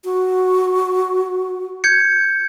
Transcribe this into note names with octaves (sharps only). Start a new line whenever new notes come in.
F#4
G6 G#6 C#7